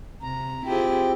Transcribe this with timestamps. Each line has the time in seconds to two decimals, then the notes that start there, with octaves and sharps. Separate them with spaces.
0.22 C3 A#5
0.66 C4 E4 F4 G4 G#4 G5